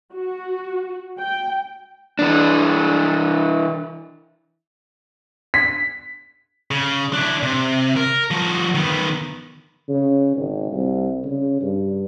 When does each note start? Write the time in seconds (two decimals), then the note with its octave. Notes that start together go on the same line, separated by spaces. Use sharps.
0.13 F#4
1.19 G5
2.19 E3 D4
5.54 B6
6.71 C#3
7.13 D4 E4
7.43 C3
7.97 A#4
8.31 F3 F#4
8.75 D#3 B3
9.89 C#3
10.36 G#1
10.72 C2
11.25 C#3
11.61 G2